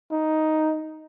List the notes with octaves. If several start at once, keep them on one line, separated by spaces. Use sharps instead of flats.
D#4